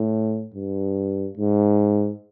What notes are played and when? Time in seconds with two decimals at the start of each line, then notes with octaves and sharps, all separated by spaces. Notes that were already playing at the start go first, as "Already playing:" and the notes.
Already playing: A2
0.54 G2
1.37 G#2